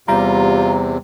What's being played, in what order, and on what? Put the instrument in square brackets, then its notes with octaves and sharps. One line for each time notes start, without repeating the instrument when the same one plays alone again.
[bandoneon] E2 C3 [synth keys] G3 [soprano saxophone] F4 [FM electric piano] A#5